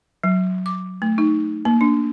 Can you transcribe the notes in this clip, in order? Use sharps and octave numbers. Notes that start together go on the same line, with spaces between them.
F#3
D6
A3
D#4
A#3
D4